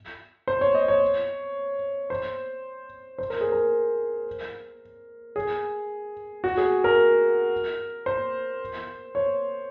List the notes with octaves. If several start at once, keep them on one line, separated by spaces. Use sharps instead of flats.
C5
C#5
D#5
C#5
C5
C5
A#4
G#4
A#4
G#4
F#4
G#4
A#4
C5
C#5